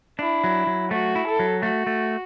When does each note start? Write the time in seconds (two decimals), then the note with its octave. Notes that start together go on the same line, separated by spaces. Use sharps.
0.19 D4 E4
0.44 F#3
0.67 F#3
0.91 A3 F#4
1.15 E4
1.27 A4
1.39 F#3
1.62 A3 F#4
1.87 A3